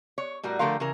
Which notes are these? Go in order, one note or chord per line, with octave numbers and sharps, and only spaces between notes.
C#5
A2 G3 F#4 A#4
D3 F3 A3 G4 A#4 F5
C#3 E3 A#4